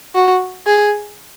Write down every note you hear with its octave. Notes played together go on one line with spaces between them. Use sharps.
F#4
G#4